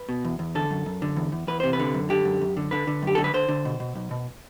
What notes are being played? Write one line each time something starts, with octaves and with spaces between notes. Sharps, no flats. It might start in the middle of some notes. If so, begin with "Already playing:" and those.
Already playing: B4
B2
E2
E2
D3 A4
F#2
F#2
D3
E2
E2
E2 B4
C3 C5
B4
D3
F#2
D3 G4
F#2
F#2
D3
D3 B4
D3
F#2 G4
D3 A4
B4
D3 C5
D3
B2
B2
B1
B2